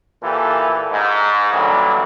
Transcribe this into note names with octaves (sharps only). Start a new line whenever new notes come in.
A#2 E3 G4 A4
G#2
D3 E3 F#3 G3 A#3